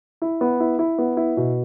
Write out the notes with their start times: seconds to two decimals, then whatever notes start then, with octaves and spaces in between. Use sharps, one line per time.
0.22 E4
0.41 B3
0.60 E4
0.79 E4
0.99 B3
1.17 E4
1.37 B2